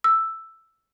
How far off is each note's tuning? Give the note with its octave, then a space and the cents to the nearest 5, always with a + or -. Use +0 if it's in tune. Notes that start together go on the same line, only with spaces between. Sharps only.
E6 +5